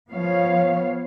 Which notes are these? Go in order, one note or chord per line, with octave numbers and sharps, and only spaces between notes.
F3 B3 C#5 F5